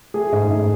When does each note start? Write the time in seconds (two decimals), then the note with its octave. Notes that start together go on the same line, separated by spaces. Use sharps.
0.14 A3 G#4
0.32 G#2
0.51 G#2